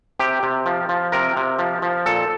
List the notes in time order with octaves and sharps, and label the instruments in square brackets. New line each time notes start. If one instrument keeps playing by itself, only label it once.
[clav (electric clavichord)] C3 G4
C3
F3
F3
C3 A#4
C3
F3
F3
A#2 A4